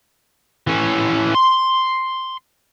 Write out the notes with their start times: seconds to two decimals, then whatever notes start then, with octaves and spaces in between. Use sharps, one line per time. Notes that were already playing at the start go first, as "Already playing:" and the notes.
0.67 E3 C#4
1.35 C6